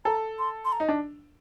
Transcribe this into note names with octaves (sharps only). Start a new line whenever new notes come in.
A4 A#5
C6
C6
A#5
D#4
D4